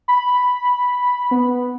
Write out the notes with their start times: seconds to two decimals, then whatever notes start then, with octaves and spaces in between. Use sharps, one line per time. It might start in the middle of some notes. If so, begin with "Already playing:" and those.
0.08 B5
1.31 B3